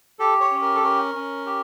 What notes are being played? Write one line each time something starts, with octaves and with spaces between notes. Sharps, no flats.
G4 A4
C#5
C#4
A#4
A4
C#4 A#4
C#4
G4